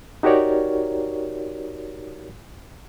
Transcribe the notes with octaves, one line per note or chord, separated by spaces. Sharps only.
D#4 F#4 G4 A#4 C#5 D5